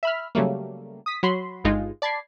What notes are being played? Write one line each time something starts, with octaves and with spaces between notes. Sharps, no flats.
E5 B5 F6
C#3 F#3 G3 A3 A#3
D#6 B6
F#3 F#4 B5 C6
G1 G2 G#3 D#4 F4
D5 A5 B5 G#6 C7